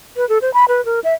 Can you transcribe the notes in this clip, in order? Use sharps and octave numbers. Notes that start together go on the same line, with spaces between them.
B4
A4
C5
B5
B4
A#4
E5